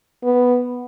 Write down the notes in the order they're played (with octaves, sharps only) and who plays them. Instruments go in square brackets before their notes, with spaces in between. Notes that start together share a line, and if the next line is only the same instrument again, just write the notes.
[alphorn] B3